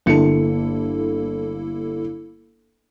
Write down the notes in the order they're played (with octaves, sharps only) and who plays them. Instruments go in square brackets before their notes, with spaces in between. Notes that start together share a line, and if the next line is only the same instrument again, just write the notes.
[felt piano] G1 C#7 [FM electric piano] A#3 E4 A4